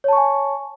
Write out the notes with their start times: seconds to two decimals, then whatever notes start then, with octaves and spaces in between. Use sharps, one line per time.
0.04 C#5
0.08 A5
0.13 C#6
0.17 G#5